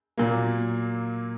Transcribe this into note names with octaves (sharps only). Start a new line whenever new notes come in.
A#2 F#3 A#3